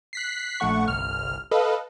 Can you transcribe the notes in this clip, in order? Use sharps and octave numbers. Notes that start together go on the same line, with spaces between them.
F#6 B6 C7
A#1 A3 F#5 C#6
G1 C2 F6
A4 B4 D#5 F5